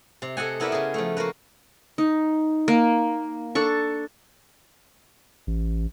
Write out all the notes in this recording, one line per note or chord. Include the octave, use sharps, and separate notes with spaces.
C3
A4 D#5 F#5 G#5
B3 E4 A#4 B4 D5 E5
C#3 G#4
F3 A3
A#3 F#4 A#4 B4
D#4
A#3
D4 A4 C#6
A1